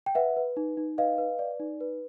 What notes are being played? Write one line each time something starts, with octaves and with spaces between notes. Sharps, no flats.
G5
B4 E5 F#5
B4
D#4
D#4
B4 D#5 F5
B4
D5
D#4
B4